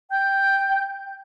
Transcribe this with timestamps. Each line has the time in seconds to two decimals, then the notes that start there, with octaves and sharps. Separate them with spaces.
0.10 G5 G6